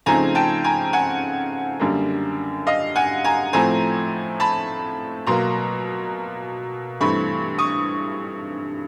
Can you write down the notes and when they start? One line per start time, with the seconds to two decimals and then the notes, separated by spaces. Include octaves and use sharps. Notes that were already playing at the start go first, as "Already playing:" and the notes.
0.06 C#3 F3 A3 C4 D#4 G#5 A#5
0.35 G5 A5
0.64 G#5 A#5
0.93 F#5 G#5
1.80 F#2 D3 G3 A#3
2.67 D#5 F5
2.96 F#5 G#5
3.24 G#5 A#5
3.53 A2 F3 A3 C4 G#5 A#5
4.40 A5 B5
5.27 B2 F#3 A#3 A#5 C6
7.00 G2 E3 A3 C4 B5 C#6
7.58 C#6 D#6